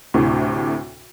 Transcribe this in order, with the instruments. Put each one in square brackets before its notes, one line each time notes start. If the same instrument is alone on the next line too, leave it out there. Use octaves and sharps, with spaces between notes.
[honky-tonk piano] D2 A2 C3